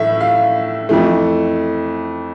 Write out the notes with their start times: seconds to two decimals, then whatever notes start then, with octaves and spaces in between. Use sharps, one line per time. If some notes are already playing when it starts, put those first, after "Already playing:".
Already playing: A2 E3 A3 E5
0.20 F5
0.89 F2 E3 A3